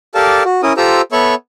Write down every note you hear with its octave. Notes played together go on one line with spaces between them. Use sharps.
G4 A4 A#4 D5 F5 A5
F#4
C#4 E4 A#4 D#6
F4 G4 A4 C5 A#5 E6
B3 A4 C#5 E5 B5 C#6